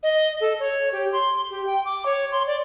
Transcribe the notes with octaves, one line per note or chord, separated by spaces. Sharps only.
D#5
A4
C#5
G4
C6
G4
G5
D6
C#5
C6
D5